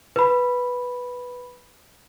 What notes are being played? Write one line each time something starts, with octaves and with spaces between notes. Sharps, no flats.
B4 B5